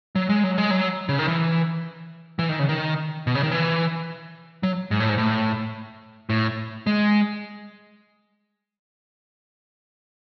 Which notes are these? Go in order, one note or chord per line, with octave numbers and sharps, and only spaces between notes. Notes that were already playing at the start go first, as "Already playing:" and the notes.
F#3
G#3
F#3
G#3
F#3
C#3
D#3
E3
E3
D#3
C#3
D#3
B2
C#3
D#3
E3
F#3
G#2
A2
G#2
A2
A2
G#3